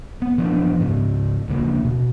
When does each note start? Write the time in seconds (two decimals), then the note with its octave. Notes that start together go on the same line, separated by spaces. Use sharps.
0.22 B3
0.38 E3 F3 B3 D4
0.80 G#2 C#3
1.48 D#2 C#3 A#3
1.85 B2